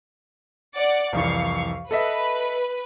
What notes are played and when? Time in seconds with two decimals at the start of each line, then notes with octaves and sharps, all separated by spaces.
0.76 D5 F#5 A6
1.13 C2 F2 E3 F5 C#6
1.91 A4 B4 D#5 E5